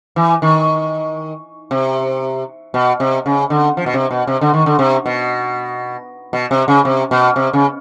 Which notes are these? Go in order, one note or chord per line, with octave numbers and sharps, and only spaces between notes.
E3
D#3
C3
B2
C3
C#3
D3
F3
B2
C3
B2
C3
D3
D#3
D3
C3
B2
B2
C3
C#3
C3
B2
C3
C#3